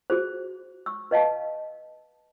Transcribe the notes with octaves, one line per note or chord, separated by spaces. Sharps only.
F#4 G#4 C5
C#6 E6
B4 D#5 F5 A5